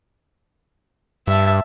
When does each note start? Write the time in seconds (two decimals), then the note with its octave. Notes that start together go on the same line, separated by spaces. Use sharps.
1.27 G2 E5 A5